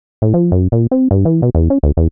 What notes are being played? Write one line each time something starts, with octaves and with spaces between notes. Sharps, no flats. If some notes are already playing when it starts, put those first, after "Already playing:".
A2
F3
F#2
A#2
C4
G2
E3
B2
E2
C#4
D2
E2